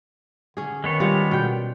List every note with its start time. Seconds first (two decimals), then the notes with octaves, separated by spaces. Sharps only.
0.57 D3 C#4 G#4
0.84 D#3 G#3 B3 C#5
1.00 G3 F4
1.31 B2 G5